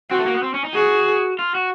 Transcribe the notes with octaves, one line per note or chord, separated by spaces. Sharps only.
C4 F#4
A3
A#3
B3
C4
C#4
D#4
F#4 G#4
F4
F#4